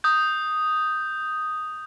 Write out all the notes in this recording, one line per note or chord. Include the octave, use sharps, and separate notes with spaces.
D#6 G6